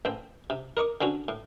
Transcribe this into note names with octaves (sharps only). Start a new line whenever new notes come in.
A1 C4 G5
C3
A#4 D#5 C#6 D6
D3 C4 C#4 F#4
A2